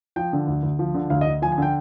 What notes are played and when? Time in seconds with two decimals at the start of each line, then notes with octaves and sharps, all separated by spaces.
0.16 F3 G5
0.33 D3
0.47 D2
0.63 D2
0.79 F3
0.94 D3
1.10 D2 F5
1.21 D#5
1.27 D2
1.42 F3 G#5
1.52 G#5
1.58 D3 G5